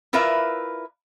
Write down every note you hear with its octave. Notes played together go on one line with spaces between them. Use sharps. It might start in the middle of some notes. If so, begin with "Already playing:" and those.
E4 F4 A#4 B4 D5 E5